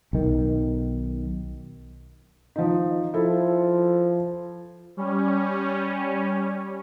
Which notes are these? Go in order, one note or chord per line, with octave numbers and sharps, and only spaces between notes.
B1 D#3
F3 D#4
F3 E4 A4
G3 C#4